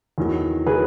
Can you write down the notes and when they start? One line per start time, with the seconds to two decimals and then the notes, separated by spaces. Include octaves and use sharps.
0.18 E2 D#3 F#3
0.66 D#3 F#3 G#4 B4